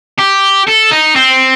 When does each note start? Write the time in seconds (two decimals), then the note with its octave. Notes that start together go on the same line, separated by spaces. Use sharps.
0.19 G4
0.67 A4
0.91 D#4
1.16 C4